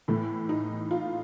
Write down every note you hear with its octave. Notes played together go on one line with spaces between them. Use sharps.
A2 E3 A3
D#4
F4